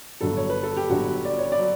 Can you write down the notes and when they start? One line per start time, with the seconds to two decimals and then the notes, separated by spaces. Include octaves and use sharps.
0.21 G1 G2 F#3 A4
0.37 C#5
0.50 B4
0.63 A4
0.76 G4
0.89 G1 G2 F#3 F#4
1.25 D5
1.38 C#5
1.52 D5
1.59 F#3